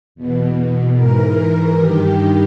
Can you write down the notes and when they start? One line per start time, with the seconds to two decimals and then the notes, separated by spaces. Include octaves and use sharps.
0.15 E2 B2
0.96 G#2 E3 A#4
1.38 A#4
1.78 G2 D#3 G4